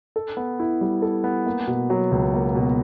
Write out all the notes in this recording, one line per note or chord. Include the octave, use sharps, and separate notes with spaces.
A4
B3
E4
G3
A4
B3
A#3
B2
F#3
C#2
A#3
B2